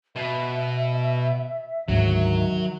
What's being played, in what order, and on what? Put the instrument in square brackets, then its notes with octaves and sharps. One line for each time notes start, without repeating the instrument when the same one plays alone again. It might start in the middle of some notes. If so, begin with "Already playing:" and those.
[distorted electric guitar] B2 [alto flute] E5
[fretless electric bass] D2 G#2 [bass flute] D#3 [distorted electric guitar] F#3